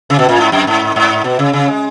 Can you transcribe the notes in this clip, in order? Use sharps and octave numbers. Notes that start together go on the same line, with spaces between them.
C#3
B2
A#2
G#2
F#2
G#2
G#2
B2
C#3
C#3
G#3